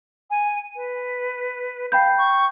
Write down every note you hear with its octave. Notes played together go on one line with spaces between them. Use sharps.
G#5
B4
F5 G5 B5 G6
C#6